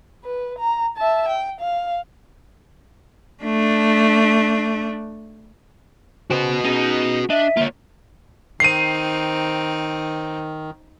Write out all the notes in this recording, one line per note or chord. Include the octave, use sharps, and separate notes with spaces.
B4
A#5
E5 A5
G5
F5
A3 D4
C#3 F#4 B4 C5 G5
C#4 D#4 G#4 D#5
D4 D#5 E5
D3 A#3 F4 C#5
D#3 C4 D#4 C7 D#7